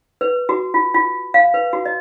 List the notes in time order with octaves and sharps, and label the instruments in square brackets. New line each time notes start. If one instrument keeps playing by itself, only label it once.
[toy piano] B4
F#4
F4
F4
F5
B4
F#4
D#5